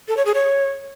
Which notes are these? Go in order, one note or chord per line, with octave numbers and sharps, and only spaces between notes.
A4
C#5
G#4
C#5